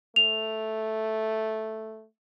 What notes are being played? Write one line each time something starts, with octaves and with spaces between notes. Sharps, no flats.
A3 F7